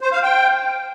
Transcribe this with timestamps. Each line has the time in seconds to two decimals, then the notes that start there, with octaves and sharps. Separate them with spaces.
0.01 C5
0.12 F5
0.23 G5